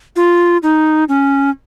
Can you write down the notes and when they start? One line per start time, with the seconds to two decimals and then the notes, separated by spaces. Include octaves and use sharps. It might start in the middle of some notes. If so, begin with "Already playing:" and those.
0.16 F4
0.63 D#4
1.09 C#4